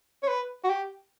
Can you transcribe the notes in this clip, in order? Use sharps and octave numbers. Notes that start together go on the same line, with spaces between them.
C#5
B4
F#4
G4